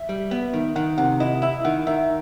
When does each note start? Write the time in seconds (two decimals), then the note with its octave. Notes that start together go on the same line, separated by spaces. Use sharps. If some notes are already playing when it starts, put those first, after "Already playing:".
Already playing: E5
0.09 G3
0.31 B3
0.53 D#3
0.76 D#3 F#5
0.98 C3 F#5
1.20 E4 D#5
1.42 E4 E5
1.65 D#3 F#5
1.87 D#3 E5